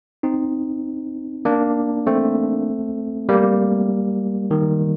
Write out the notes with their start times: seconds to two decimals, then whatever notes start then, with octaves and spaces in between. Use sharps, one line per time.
0.23 C4 D#4
1.45 A#3 D4
2.07 A3 C4
3.29 G3 A#3
4.51 D#3